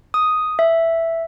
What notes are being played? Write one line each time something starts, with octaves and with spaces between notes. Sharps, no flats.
D#6
E5